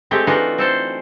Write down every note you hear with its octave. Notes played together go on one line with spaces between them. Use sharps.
G#3 A3 C4 G4
E3 D4 D#4 F4 F#4
C4 A4 C5